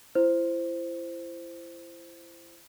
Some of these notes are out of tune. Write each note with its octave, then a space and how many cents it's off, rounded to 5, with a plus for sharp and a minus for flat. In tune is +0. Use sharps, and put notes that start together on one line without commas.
E4 +35 C5 +0